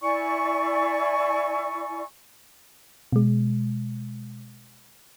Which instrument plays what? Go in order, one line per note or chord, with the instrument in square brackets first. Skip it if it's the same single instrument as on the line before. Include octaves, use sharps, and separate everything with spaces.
[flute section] E4 D5 G#5 C#6
[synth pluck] B2 G#3